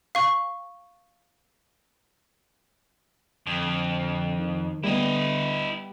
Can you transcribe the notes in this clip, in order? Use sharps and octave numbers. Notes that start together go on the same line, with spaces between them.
F5 C#6
F2 D3
D#3
D3 G3 B3 E4 D#5